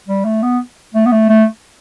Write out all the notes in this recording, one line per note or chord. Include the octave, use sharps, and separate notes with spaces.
G3
A3
B3
A3
B3
A3
A3